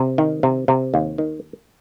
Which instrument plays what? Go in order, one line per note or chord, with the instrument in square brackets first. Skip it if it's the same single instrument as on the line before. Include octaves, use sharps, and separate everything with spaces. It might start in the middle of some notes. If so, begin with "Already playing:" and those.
Already playing: [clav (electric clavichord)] C3
D#3
C3
C3
D#2
D#3